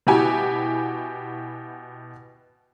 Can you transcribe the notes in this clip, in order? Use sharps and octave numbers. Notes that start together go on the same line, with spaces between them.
B2 E4 F#4 G4 G#5